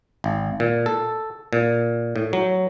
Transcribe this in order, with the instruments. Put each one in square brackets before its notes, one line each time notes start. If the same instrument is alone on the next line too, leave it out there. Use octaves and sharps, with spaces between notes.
[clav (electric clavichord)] G#1
A#2
A4
A#2
A2
F#3